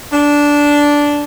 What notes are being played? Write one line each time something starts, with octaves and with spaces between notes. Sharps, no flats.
D4